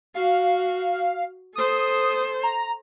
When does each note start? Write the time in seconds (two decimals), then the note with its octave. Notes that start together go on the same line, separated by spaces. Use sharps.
0.15 F#4 F5
1.55 A4 C5 D#6
2.43 A#5